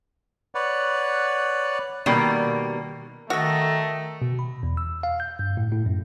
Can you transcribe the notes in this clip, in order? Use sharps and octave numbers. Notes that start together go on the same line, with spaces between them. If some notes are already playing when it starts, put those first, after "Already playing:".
B4 C#5 D5 F#5
B2 D#3 G3 A#3
D#3 A3 F#4 A4 D#5
B2
B5
E2
E6
F5
G6
G2
A2
A2
F#2